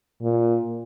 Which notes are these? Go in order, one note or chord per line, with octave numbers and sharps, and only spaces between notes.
A#2